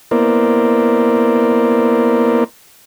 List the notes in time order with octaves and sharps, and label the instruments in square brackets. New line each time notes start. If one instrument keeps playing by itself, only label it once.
[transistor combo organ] A#3 B3 E4 A#4 C5 D5